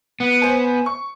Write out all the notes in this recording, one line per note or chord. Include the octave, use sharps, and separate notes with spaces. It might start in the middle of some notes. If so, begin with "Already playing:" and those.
B3
C5 G#5
C#6